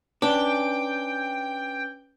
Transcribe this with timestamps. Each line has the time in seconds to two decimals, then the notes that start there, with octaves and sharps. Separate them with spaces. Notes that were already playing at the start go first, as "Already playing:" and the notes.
0.22 C#4 D4 B4 G5 D6